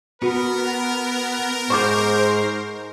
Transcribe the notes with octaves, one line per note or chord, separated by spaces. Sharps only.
B3 F#4 A#4
G#2 C5 C#6 D6 G6